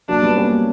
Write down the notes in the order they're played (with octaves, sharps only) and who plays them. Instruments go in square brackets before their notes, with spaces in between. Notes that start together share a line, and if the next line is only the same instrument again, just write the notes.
[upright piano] F#3 A#3 [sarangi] D4
[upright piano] G3 B3
A#3 C#4